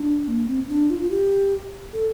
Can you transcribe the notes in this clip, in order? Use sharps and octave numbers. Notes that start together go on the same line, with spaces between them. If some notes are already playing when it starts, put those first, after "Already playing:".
Already playing: D4
A#3
C4
C4
D4
F4
F4
G4
A4